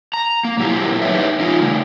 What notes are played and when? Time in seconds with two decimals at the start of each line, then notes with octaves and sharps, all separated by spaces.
0.14 A#5
0.45 A#3
0.58 A#2 F#3 D#4 E4 G4
1.02 D#4 G4 B4 C#5 E5
1.40 E3 D#4 F4
1.61 C#3 A3